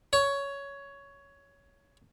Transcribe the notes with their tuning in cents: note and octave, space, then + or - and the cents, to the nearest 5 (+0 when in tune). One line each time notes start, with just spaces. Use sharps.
C#5 +10